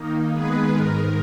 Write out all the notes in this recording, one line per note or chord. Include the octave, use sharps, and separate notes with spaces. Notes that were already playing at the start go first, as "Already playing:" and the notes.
Already playing: D#3 A#3 D#4
D#3 G#3 B3 G#4 B4
G#2 D#3 G#3 A#4